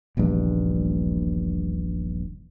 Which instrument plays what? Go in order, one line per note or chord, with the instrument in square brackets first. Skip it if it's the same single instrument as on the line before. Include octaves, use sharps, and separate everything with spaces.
[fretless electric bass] D#1 A#1 E2 G2